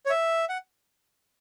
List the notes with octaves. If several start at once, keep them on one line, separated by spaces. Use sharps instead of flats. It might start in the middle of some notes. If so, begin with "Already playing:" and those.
C#5
E5
F#5